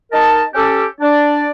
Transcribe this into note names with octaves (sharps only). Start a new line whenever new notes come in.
D#4 A#4 D#5 A5
C#4 G4 A4
D4 D5